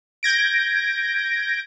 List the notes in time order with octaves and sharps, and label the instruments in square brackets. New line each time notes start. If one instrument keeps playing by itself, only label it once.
[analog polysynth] G6 G#6 A#6 D7